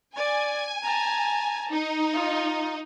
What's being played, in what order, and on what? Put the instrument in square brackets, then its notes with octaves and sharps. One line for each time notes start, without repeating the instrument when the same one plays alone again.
[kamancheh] D5 [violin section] G#5
[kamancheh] A5 A#5
[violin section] D#4
[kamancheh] F4